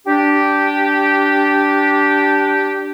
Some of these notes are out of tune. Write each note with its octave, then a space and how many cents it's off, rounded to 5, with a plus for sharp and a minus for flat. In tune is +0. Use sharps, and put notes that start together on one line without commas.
D4 -10 G4 -10